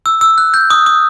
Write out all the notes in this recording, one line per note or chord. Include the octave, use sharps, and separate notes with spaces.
E6
E6
F#6
G6
D#6
D#6